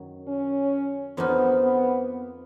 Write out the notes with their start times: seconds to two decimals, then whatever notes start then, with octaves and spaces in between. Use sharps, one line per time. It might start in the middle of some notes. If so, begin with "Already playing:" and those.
Already playing: F#2 D#3 F#3
0.28 C#4
1.17 F2 F3 A#3 B3 D#4
1.62 B3